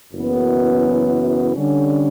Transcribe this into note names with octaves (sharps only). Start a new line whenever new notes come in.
F#1 F#2 E3 B3
D3 G3 C#4